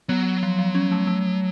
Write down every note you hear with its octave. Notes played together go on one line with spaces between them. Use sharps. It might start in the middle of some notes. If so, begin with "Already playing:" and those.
F#3 B3
F3
F3
C#4
A3
A3